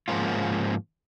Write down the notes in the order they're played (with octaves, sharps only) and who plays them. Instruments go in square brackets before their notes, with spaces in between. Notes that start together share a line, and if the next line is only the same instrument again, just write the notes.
[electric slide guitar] G#2 F3 A#3 C#4 F4